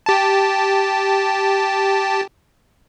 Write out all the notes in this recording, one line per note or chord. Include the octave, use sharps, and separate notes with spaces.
G4 A5